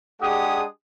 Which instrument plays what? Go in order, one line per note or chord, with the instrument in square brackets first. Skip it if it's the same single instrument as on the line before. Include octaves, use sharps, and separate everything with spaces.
[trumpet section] G#3 D4 G4 G#4 F#5 D#6